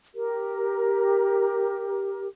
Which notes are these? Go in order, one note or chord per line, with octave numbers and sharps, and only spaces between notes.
G4 A#4